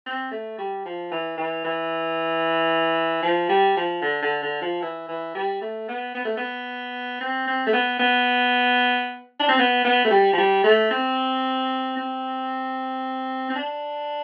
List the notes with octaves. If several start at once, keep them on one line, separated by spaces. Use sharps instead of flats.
C4
A3
G3
F3
E3
E3
E3
F3
G3
F3
D3
D3
D3
F3
E3
E3
G3
A3
B3
B3
A3
B3
C4
C4
A3
B3
B3
D4
C4
B3
B3
A3
G3
F3
G3
A3
C4
C4
C4
D4